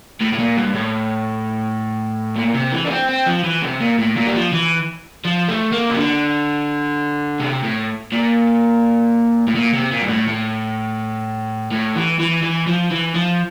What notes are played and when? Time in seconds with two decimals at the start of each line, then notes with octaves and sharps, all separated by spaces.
0.21 A2
0.32 A2
0.39 A#2
0.57 G2
0.75 A2
2.36 A#2
2.55 C3
2.72 E3
2.85 D4
2.91 C4
3.09 C4
3.26 F3
3.44 E3
3.62 C3
3.80 A#2
3.98 A2
4.16 A#2
4.26 G3
4.34 F3
4.52 E3
5.25 F3
5.48 A3
5.72 A#3
5.90 C3
5.96 D3
7.40 C3
7.64 A2
8.12 A#2
9.47 A2
9.55 A#2
9.74 C3
9.92 A#2
10.02 G2
10.09 A2
10.28 A2
11.71 A2
11.95 E3
12.19 E3
12.43 E3
12.67 F3
12.91 E3
13.15 F3